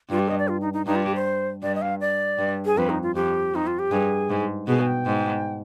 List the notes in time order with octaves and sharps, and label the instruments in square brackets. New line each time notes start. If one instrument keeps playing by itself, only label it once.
[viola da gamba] G2 [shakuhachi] F4
[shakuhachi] G4
D#5
D5
F4
D#4
D#4
[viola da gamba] G2 [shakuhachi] D#4
[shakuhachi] F4
G4
C5
[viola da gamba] G2 [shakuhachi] D5
[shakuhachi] D#5
F5
D5
[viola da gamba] G2
[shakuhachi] G#4
[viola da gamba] F2 [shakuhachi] B4
[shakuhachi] D#4
F4
[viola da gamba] F2 [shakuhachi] G4
[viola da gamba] F2 [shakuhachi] D#4
[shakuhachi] F4
G4
[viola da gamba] G2 [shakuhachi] G#4
[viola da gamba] G#2
[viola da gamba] B2 [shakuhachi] G#4
[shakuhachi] G#5
G5
[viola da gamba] G#2